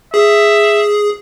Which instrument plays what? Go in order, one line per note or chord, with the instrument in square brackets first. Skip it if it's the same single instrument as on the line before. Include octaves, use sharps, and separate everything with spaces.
[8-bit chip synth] G#4 [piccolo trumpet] E5